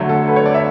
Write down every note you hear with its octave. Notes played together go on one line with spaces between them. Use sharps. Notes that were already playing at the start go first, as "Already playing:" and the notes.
Already playing: D3 F#3 A3
A4
B4
C#5
D5
E5